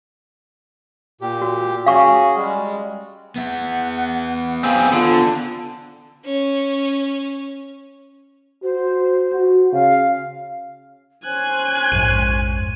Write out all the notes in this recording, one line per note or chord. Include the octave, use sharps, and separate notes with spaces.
A#2 G4
F#4
C#4 F#4 G#4 F5 C#6
G3 G#3
B3 E5 F#5
C4 G#4 F5
D3 F4
C#4
F#4 C5
F#4
C#3 F5
C#4 C5 G#5 F#6 G#6
A#1 F2 G#2 D#7